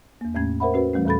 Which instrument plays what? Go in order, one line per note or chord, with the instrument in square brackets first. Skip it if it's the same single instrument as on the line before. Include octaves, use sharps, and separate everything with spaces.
[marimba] E2 A#3
E2 A2 A3 C#4 G#6
A#4 C5 E5 F#5 B5
C#4 F#4 B4
E3 G3 A3 C#4
E2 A#2 G3 A4 B5 A6